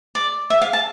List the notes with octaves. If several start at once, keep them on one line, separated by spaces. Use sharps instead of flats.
D5
E5
F5
A5